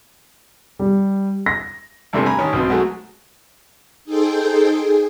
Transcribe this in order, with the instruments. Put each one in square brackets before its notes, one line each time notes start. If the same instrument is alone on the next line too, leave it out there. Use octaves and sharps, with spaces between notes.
[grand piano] G3
A#6
[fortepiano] E2 G2 C3 E3 A3
G#5 A#5 B5
A1 D#3 C#4 C#6
B1 B2 C4
F#3 G#3 A3 F#4
[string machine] D#4 G#4 A4 C5 G5
G#4